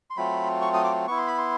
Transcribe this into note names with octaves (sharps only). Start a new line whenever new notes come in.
C6
F#3 A3 C4 F4 B5
C#6
D#6
D6
B3 E4 C#6
C6
B5
C6